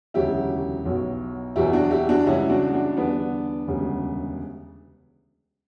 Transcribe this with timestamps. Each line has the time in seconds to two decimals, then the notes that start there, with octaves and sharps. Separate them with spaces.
0.14 E1 D2 C#3 F#3 E4 G4
0.85 B1 B2 F#3
1.56 E2 B2 F#3 E4 G4
1.73 D4 F#4
1.91 E4 G4
2.09 D4 F#4
2.27 C#2 C#3 E3 G3 C#4 E4
2.50 D4 F#4
2.73 D4 F#4
2.97 E2 D3 G3 B3 D4
3.68 E1 D2 C#3 G3